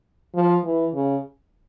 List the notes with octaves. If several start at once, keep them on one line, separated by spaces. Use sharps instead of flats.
F3
E3
C#3